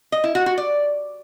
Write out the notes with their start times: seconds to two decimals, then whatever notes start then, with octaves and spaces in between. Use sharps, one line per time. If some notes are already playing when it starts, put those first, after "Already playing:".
0.12 D#5
0.24 E4
0.35 F#4
0.46 F#4
0.58 D5